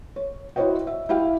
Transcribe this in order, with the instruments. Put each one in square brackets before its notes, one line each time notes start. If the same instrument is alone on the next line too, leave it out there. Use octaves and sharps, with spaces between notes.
[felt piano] C#5
E4 F#4 C5 C#5 D#5 G5
E5
E4 G4 F5 G5